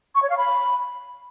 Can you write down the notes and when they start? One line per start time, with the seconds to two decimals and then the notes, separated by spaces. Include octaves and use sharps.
0.15 C#6
0.22 C#5
0.30 F5
0.37 B5